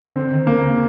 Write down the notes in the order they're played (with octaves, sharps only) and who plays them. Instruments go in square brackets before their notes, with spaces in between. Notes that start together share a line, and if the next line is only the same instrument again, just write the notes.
[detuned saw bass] D3 [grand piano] C4
[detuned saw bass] D#3
[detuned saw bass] D3 [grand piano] A#3
[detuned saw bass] C#3